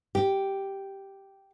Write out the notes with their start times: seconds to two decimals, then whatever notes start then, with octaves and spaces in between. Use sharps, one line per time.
0.15 G4